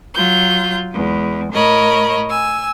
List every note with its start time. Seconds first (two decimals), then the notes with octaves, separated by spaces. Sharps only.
0.14 F#3 F4 G6
0.90 E2 G#3
1.51 A2 A#4 C#5 D#5 B5
2.29 G#5 E6